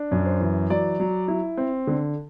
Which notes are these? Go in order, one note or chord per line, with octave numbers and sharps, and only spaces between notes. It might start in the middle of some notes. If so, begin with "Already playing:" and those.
Already playing: D4
F#2
C5
E3
F#3 D5
F#3
E4
C4
D3